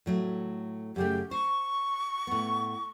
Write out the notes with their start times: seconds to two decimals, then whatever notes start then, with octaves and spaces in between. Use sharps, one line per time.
0.06 A2 F#3 A3
0.96 F#2 C#3 A3 G4
1.31 C5 C#6
2.27 A2 B3